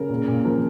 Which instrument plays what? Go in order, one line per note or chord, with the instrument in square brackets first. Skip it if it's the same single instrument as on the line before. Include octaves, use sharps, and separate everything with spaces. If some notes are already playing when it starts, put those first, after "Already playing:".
Already playing: [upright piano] C#3 A#4
A#2
A#2
F3 A#4